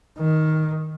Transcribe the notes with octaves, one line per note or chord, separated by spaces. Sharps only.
D#3